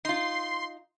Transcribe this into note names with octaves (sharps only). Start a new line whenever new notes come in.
D#4 F4 C6